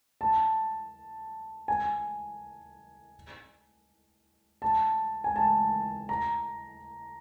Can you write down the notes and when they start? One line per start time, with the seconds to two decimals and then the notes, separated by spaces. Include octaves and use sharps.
0.21 A5
1.68 G#5
4.62 A5
5.24 G#5
5.36 A5
6.09 A#5